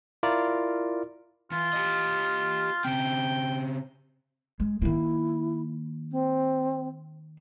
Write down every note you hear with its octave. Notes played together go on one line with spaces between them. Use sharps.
E4 F4 A#4 D5
E3 F4
G4 D#5
C#3 C4 G5
G#3
D#3 A#3 E4
C4